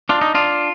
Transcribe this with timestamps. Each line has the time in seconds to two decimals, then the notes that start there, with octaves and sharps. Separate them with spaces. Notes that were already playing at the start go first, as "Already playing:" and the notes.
0.09 D4 F4
0.21 D#4
0.35 D4 F4